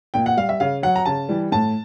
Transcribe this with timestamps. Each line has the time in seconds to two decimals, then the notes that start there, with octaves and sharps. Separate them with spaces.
0.14 A#2 G5
0.26 F#5
0.37 G3 F5
0.49 E5
0.60 C#3 F5
0.83 F#3 F#5
0.96 A#5
1.06 C#3 A5
1.29 E3 G3
1.52 A2 A5